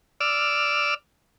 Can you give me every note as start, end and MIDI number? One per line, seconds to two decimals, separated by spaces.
0.20 0.94 74
0.20 0.94 88
0.20 0.94 89